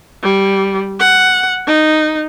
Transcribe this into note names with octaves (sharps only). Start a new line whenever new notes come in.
G3
F#5
D#4